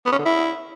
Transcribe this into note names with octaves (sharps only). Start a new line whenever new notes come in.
B3
C#4
D3
E4